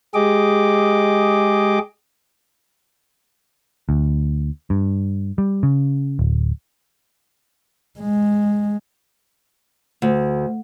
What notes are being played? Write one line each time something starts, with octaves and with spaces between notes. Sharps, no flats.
G#3 G4 G#4 D#5 D6
D2
G2
G3
C#3
D1
G#3
D2